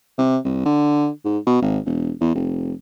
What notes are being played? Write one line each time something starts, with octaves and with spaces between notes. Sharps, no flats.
C3
C2
D3
G#2
B2
G#1
E1
E2
F1